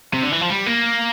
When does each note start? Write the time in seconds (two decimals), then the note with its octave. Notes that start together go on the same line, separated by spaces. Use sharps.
0.14 C3
0.23 D3
0.32 E3
0.41 F3
0.50 G3
0.66 A#3